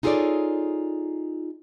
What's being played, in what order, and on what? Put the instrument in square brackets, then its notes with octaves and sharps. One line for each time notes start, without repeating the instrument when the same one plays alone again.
[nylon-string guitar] D#4 F4 G#4 A4 C#5 D5